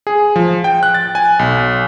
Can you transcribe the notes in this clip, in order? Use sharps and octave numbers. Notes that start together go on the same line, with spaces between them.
G#4
F3
G5
F#6
A6
G#5
B1